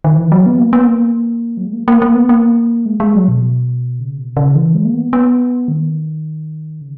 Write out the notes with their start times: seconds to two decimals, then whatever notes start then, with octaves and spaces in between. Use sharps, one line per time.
0.04 D#3
0.18 E3
0.32 F#3
0.46 B3
0.60 A#3
0.73 B3
0.83 A#3
1.57 F#3
1.66 G#3
1.73 A#3
1.88 A#3
2.02 A#3
2.15 B3
2.29 A#3
2.86 G#3
3.00 G#3
3.15 F#3
3.28 B2
4.00 C#3
4.18 B2
4.37 C#3
4.55 E3
4.75 G#3
4.85 A#3
4.93 B3
5.13 B3
5.68 D#3
6.81 C#3